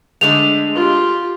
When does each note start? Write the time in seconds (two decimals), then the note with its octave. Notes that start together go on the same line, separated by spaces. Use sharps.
0.21 D3 G#3 A3 F7
0.75 F4 G4